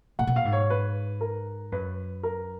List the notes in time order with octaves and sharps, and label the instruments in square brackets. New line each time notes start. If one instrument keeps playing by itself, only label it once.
[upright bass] A#2 [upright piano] F#5
[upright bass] B2
[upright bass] A#2 [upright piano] F5
[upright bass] G#2
[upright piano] C#5
B4
A#4
[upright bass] F#2 [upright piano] B4
[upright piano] A#4